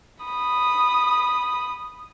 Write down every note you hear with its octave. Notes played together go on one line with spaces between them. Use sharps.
B5 D#6